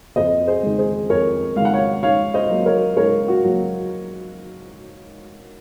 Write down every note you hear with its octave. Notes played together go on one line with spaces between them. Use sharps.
F2 C5 D#5
G#4 C5
D#3 G#3
G#4 C5
F2 A#4 C#5
D#3 G#3 F5 F#5
C#5 F5
G#2 C#5 F5
C5 D#5
F#3 A#3
A#4 C#5
G#2 A#4 C#5
F#4
F#3 A#3